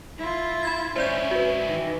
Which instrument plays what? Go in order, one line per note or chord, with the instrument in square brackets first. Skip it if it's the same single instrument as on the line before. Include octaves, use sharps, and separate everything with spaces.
[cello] E4 F4
[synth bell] B5 G#6 A6
[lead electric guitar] G#2 E4 [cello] C#4 [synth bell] C5 D5 G6
[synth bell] F#4 B4
[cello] D#3 E3